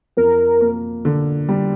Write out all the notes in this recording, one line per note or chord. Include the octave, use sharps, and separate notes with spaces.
F2 A#4
A#3
D3
G3